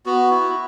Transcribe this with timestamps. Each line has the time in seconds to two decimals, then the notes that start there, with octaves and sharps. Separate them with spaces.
0.06 B3 F#4
0.31 E4